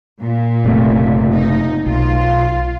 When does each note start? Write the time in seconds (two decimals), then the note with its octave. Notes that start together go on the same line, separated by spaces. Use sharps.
0.20 A#2
0.64 F#1 C3 A3
1.35 D#4
1.86 B1 F4